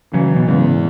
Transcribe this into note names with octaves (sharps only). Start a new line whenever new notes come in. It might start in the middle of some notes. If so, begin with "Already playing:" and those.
C#3 E3 F#3
B2
G#2 C#3 B3